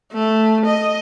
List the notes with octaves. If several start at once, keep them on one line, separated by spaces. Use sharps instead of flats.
A3
D#5